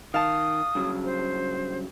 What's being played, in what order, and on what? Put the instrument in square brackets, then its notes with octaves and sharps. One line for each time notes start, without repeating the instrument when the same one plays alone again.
[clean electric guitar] D#3 [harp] F5 A5 [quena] D#6
[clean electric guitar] G2 C#3 F#3
[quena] C5